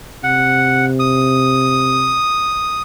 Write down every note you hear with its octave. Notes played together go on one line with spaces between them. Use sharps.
C3 F#5
D#6